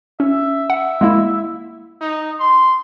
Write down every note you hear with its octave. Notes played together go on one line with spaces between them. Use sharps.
C#4 E5
F#5
G#3 A#3 E4
D#4
C6